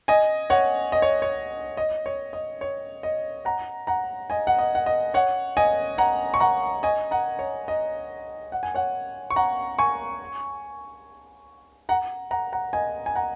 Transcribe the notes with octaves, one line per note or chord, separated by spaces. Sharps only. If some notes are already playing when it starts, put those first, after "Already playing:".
D#5 G#5
C#5 F#5
D#5
C#5
C#5
D#5
C#5
D#5
C#5
D#5
F#5 A#5
F#5 A#5
D#5 G#5
F#5
D#5
F#5
D#5
C#5 F#5
D#5 G#5
F#5 A#5
C#6
F#5 A#5
D#5 G#5
F#5 A#5
C#5
D#5
F#5
G#5
C#5 F#5
C#6
F#5 A#5
G#5 C#6
F#5 A#5
F#5 A#5
F#5 A#5
D#5 G#5
G#5
F#5 A#5